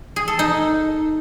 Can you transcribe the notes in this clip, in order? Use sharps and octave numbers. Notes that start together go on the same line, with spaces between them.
G#4
A4
D#4